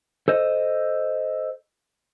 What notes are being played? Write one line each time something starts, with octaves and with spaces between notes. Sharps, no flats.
A4 C5 D#5